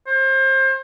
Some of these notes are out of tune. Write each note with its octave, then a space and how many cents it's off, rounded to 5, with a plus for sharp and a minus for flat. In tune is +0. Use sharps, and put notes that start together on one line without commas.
C5 +30